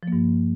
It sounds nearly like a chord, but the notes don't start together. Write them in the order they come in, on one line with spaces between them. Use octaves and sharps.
F3 A#3 G2